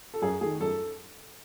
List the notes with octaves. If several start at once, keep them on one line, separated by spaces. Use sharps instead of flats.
A4
F#2 G#4
D#3 A3 G#4
F#2 A4